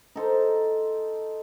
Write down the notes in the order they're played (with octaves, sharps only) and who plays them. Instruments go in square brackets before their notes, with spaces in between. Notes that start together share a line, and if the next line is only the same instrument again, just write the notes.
[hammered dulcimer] D#4 A4 C5 A#5